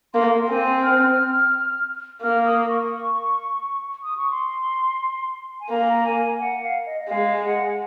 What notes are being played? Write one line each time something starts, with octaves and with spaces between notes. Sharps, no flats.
A#3 C6
C4 G#5
F6
A#3 F6
D#6
C#6
D#6
C#6
C6
G#5
A#3 A#5
A#5
G#5
F#5
F5
D#5
D#5
G#3 F5
F#5